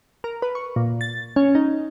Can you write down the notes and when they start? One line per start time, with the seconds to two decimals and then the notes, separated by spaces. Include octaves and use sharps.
0.24 A#4
0.42 B4
0.55 C#6
0.76 A#2
1.01 A6
1.36 C#4
1.55 D#4